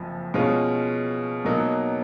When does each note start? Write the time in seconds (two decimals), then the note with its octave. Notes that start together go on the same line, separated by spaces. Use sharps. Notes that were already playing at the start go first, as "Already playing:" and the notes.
Already playing: F#1 F2 F3
0.34 B2 G#3 C#4 F4
1.45 B2 F#3 A#3 D#4